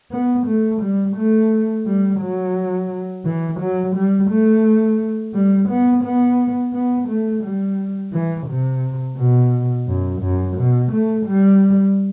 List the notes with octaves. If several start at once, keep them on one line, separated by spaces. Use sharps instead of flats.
B3
A3
G3
A3
G3
F#3
E3
F#3
G3
A3
G3
B3
B3
B3
A3
G3
E3
C3
B2
F#2
F#2
B2
A3
G3